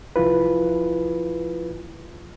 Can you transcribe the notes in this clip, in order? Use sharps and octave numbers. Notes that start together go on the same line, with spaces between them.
C2 F3 E4 F4 B4